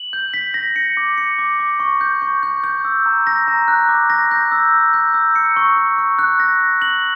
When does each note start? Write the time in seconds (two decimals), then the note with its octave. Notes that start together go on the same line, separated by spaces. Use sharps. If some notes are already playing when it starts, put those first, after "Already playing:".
Already playing: F#7
0.13 G6
0.34 B6
0.54 A#6
0.76 C#7
0.97 D6
1.18 C#7
1.39 D6
1.60 D6
1.80 C#6
2.01 G6
2.22 C#6
2.43 G6
2.64 G6
2.85 E6
3.06 A#5
3.27 A#6
3.48 A#5
3.68 F#6
3.89 D6
4.10 A#6
4.31 G6
4.52 E6
4.73 E6
4.93 G6
5.14 E6
5.36 C#7
5.56 C#6
5.77 C#6
5.98 C#6
6.19 F#6
6.40 A#6
6.61 A#6
6.82 F#7